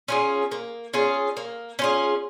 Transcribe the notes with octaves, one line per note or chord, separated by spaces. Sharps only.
C#4 F4 G#4
A#3
C#4 F4 G#4
A#3
C#4 F4 G#4